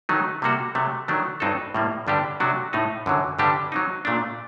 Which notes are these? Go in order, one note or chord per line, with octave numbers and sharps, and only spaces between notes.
D#3 F#3 A3 D#4
C3 G3 A#3 F#4 A4
C3 F#3 A3
D#3 F#3 A3 D4
G2 F#3 C4 D#4 A4
A2 G3 A#3
G2 D3 G3 D4 G4
C3 F#3 A3 D4 F#4
A2 A3 D#4
F#2 D3 F#3
G2 D3 G3 D4 G4
F#3 C4 D#4
A#2 A3 D4